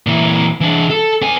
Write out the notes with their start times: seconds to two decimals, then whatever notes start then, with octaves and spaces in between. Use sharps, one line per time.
0.07 A#2 E3
0.61 E3 D4
0.90 A4
1.22 B3 G#5